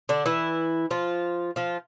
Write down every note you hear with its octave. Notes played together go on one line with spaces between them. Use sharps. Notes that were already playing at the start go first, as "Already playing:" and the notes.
D3 D4
E3 E4
F3 F4
F3 F4